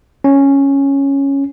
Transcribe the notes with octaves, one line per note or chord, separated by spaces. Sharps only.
C#4